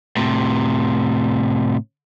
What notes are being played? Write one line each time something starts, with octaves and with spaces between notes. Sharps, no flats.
A2 C3